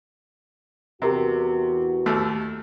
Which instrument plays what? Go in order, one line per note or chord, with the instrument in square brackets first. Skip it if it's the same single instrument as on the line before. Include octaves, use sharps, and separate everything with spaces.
[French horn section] E2 E3 F#4 [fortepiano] C3 [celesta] G4 A#4 A#5
[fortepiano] D#2 A3